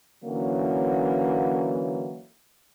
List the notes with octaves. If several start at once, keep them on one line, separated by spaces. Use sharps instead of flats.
D3 E3 F#3 A#3 C#4